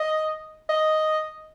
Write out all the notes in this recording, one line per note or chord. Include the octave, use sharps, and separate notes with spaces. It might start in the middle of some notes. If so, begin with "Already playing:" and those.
Already playing: D#5
D#5